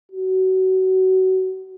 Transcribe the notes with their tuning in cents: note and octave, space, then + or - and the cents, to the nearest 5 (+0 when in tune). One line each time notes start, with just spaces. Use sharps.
F#4 +25